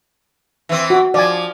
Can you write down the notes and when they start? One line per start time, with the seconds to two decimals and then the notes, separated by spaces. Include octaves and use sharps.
0.69 E3 C4
0.90 F#4
1.14 F3 D5 G#5